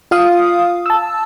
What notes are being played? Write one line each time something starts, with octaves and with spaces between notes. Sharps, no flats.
F4 F5 D#6
A5 E6